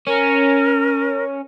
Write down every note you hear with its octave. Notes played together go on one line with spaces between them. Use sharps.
C#4 A#4